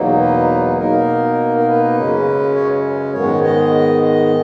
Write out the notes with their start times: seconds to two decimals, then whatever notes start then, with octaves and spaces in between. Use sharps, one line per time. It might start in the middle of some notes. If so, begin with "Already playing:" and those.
Already playing: E2 B2 F#3 A#3 D#4
0.20 B4
0.78 B2 A#3 D#4 A#4
1.58 A#4
1.67 B4
1.96 F#2 C#3 G#3 C#4
2.55 C#5
3.13 G#2 D#3 G#3 B3 C#5
3.43 D#5
4.03 D#5